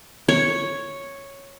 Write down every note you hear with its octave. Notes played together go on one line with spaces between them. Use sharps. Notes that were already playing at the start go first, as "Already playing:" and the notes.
C#5